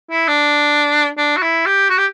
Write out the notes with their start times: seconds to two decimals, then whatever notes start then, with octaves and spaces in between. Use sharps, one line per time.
0.11 E4
0.28 D4
1.18 D4
1.37 F#4
1.42 E4
1.66 G4
1.90 F#4
1.98 G4